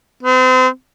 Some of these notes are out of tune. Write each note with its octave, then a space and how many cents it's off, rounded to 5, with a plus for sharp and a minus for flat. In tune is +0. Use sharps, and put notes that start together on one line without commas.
C4 -35